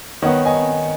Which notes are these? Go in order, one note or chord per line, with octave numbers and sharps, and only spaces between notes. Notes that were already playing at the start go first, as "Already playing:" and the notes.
D#3 B3 D#4 C#5 F#5
D#5 G#5